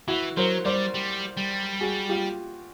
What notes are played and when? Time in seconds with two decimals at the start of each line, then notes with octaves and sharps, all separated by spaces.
0.08 E3 E4 F#4
0.37 F#3 A#4 C5
0.65 G3 C5 D5
0.94 G3
1.37 G3
1.80 F#4 G#4
2.09 F4 G4